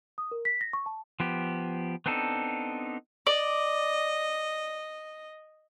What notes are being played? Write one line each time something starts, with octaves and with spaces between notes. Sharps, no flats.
D#6
A#4
B6
A#6
C#6
A5
F3 B3 G4
B3 C4 D4 D#4 A4
D5 D#5